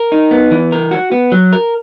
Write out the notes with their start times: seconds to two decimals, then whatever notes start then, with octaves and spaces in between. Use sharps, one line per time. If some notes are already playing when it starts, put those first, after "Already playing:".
Already playing: A#4
0.12 D#4
0.31 B3
0.51 E3
0.72 A#4
0.91 F#4
1.12 B3
1.32 F#3
1.53 A#4